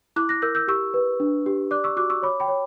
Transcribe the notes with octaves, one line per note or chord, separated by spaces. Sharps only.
E4 D6 F#6
F#6 A#6
A#4 E6 G6
E6 G6
G4 C#6 E6
B4
D4
G4
D5 D6 F#6
C#6 E6
F#4 D6 F#6
C#6 E6
C#5 B5 D6
G5 B5
C#5